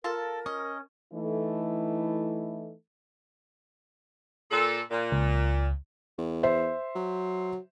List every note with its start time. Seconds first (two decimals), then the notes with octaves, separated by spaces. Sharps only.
0.04 F4 A4 A#4 A5
0.46 C#4 D#5
1.13 E3 A3 D#4 E4 A4
4.51 A#2 A4
4.91 A#2
5.12 C#2
6.18 E2
6.43 C5 E5
6.95 F#3